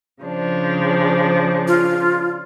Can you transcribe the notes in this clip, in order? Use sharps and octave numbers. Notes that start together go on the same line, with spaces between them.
C#3 F3 D4
F4